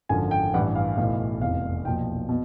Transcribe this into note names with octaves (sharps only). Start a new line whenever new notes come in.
G#1 F#2 D3 F3 G#5
G5
A1 G2 E3 F#5
F5
B1 A2 E3 F5
F1 E2 C3 F5
B1 A#2 F3 G5
B2